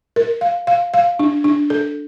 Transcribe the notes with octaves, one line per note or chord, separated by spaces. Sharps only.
A#4
F5
F5
F5
D4
D4
A4